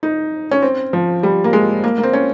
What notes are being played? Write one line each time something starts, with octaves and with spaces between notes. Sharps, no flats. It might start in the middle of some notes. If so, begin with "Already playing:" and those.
D#4
C#4
C4
F3
G3
A#3
G#3
A#3
A#3
C4
C#4